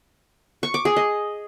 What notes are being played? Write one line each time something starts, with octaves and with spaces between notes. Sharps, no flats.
C#6
D6
G#4
D#5